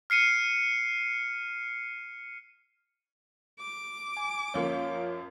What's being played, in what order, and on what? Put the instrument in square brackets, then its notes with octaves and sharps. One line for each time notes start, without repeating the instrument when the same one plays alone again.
[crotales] F6 C7 C#7 D#7
[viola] D6
[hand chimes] G#5
[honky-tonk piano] F#2 F3 A#3 [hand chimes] C#5 F5